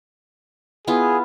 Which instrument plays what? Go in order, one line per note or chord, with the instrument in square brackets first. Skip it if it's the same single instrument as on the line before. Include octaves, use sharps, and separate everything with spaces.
[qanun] B3 E4 F4 [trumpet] G#4